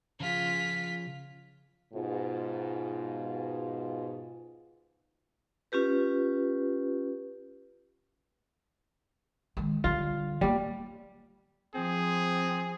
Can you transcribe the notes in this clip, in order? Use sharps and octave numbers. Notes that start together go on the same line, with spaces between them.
C#3 F3 F4 G#4 B6
G#2 B2 F4
C#4 F4 G4 B4
D#3 G#3
D3 G3 F4
G3 A#3 B3
F3 C4 G#4